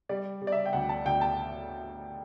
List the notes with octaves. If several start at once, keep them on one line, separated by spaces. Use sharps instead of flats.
G3 D5
G3
D5
E5
G5
D2 F#5
A5
D2 G5
A5